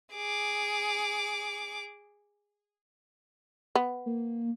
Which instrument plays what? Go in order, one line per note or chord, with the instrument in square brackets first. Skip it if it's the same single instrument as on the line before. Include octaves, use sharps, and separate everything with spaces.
[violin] G#4 D6
[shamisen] B3
[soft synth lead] A#3